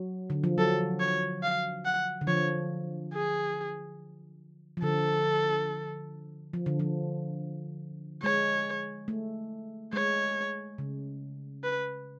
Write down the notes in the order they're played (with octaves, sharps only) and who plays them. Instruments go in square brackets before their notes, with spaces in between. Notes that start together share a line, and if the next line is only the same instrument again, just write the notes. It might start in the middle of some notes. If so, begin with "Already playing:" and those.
Already playing: [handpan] F#3
D3
F3
[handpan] F#3 [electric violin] A4
[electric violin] C#5
F5
F#5
[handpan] D3
[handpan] F3 [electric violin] C#5
[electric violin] G#4
[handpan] F3
[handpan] D3 [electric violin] A4
[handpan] F3
D3
F3
[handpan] G#3 [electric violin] C#5
[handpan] A3
[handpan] G#3 [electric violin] C#5
[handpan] C#3
[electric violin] B4